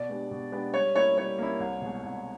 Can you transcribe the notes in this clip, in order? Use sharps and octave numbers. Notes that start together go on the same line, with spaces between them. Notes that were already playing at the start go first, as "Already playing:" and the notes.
Already playing: B2 D5
G#3 B3 D4 G4
B2
G#3 B3 D4 G4
G3 C#5
A#3 C#4 E4 C#5
G3 C#5
A#3 C#4 E4
C2
B2 G#3
C2